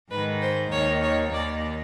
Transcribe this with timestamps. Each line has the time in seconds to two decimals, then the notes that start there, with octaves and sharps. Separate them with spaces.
0.11 G#2 D#3 B4
0.42 C5
0.72 D#2 D#3 C#5
1.03 C#5
1.33 D#2 D#3 D5